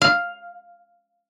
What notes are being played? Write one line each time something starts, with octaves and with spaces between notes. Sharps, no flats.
F5